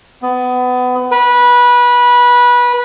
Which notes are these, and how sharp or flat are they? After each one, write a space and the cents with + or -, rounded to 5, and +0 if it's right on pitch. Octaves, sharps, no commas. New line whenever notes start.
B3 +25
B4 -20